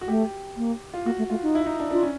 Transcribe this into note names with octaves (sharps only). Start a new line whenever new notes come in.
F#4
A3 G4
A#3
F4
A#3 F#4
A3
A3 F4
D#4
E4
D#4
D4
D4 F4
C#4